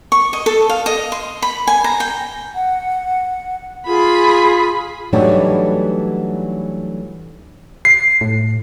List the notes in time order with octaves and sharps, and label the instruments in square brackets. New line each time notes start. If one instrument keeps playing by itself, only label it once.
[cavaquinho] C#6
D#5
A4
F5
D#5
C6
B5
G#5
A#5
G5
[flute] F#5
[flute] F4 [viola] G#4 B5
[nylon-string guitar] E3 F#3 G3 A3 D4 D#4
[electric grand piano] C7
[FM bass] A2